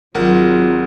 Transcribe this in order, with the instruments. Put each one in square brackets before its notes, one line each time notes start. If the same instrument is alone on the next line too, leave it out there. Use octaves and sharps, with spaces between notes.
[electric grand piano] G#1 A#4 F#5 [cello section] F#3 [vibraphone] C4 F4 G#4